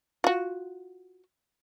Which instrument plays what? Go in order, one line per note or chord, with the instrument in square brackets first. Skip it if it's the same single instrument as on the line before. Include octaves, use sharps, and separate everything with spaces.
[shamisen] F4 F#4